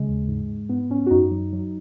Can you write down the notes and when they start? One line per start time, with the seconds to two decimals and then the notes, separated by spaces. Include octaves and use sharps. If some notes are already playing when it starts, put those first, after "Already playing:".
Already playing: C#3 G#3
0.08 D#2
0.28 G#2
0.49 G#2
0.69 G#2 B3
0.90 G#2 C#4
1.06 F#4
1.11 F#2 D#4
1.31 F#3
1.53 F#3